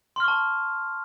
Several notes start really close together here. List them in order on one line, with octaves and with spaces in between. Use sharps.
C6 F6 C#6 A5